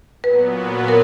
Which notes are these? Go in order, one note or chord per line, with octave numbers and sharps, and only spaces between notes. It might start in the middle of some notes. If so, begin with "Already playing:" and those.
A#2 F#3 B3 B4
A#4